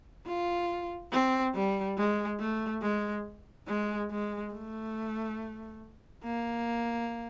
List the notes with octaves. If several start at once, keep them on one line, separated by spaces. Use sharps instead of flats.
F4
C4
G3
G#3
A3
G#3
G#3
G#3
A3
A#3